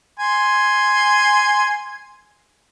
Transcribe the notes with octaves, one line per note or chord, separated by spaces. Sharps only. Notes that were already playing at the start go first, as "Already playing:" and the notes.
G#5 C6